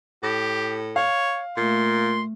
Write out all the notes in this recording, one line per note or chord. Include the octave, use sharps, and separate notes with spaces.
A2 G4
C#5 F5
A#2 A3 C6